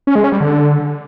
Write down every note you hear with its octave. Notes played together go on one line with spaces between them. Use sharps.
C#4
G#3
C#4
G3
D3